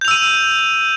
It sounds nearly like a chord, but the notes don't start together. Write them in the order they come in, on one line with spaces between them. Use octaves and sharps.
G6 F7 E6 D#7